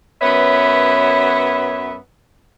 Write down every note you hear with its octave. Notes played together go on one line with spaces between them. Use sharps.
F#2 B3 B4 C#5 E5